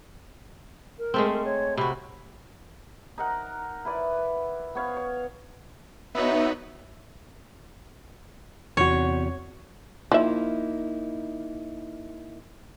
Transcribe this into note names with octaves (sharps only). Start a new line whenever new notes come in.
A#4
G#3 A3 C4
A#4
C#5
C3 F#4 B5
D#4 A#4 F#5
E4 B4 D5
B3 C#5 F5
C#5
B3 D#4 F#4 B4 C#5 E5
E2 C3 F#4 C#5
F3 A#3 D#4 E4 E5